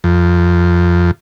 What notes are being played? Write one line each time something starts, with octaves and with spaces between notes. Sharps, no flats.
F2